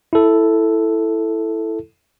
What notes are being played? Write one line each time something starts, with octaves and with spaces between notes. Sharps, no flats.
E4 A4